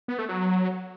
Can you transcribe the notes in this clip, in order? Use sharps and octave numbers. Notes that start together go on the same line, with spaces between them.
B3
A3
F#3